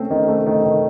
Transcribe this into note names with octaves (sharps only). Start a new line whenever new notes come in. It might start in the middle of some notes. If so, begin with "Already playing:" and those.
Already playing: A3 C4 C#4
D#3
A3
D#3
D#3